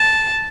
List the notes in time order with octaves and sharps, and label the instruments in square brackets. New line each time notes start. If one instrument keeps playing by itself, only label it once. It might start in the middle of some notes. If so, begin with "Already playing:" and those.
Already playing: [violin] A5